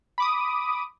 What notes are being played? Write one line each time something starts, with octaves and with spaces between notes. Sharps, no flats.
B5 D6 D#6